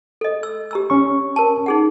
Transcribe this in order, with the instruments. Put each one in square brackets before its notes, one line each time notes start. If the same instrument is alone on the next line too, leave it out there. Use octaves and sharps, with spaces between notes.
[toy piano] A4 D#5
E6
G4 A#5 E6
[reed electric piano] C#4 C#6
[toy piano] A#4 A5
D#4 G#4 F#5